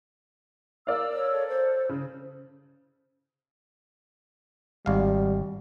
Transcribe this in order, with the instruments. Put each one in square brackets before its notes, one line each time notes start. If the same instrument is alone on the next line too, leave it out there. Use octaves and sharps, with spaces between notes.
[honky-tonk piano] A#4 D5 F5 [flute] E6
[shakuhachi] C#5
[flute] A4
[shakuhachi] C5
[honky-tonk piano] C#3
[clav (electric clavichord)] G#1 F5 [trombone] G3